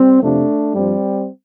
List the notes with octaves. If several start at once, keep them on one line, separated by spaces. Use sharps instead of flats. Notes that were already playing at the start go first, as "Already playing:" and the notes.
Already playing: G3 C4
F2 C3 F3 A3 D4
G2 F3 G3 C4